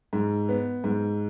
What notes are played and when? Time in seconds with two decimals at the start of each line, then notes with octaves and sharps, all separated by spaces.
0.13 G#2
0.49 B3
0.84 G#2